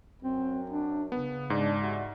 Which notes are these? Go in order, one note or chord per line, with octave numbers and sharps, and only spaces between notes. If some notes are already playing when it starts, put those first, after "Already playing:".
F#2 C4
D4
C#3 B3
G#2 D4
G3 E4 F#4